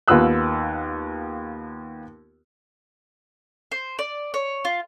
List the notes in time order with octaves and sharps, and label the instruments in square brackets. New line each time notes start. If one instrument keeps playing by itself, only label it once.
[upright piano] D#2 B3 F4 E6 F#6
[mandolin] C5
D5
C#5
F4